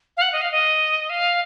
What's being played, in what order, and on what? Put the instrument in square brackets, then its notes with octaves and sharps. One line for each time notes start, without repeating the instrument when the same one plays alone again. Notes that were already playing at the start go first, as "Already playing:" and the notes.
[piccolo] F5
F#5
D#5
F5
D#5
F5